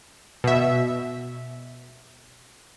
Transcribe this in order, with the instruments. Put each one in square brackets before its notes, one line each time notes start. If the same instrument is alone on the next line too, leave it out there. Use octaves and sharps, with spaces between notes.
[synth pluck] B2 E5